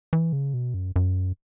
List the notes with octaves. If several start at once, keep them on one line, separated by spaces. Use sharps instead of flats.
E3
C#3
B2
F#2
F#2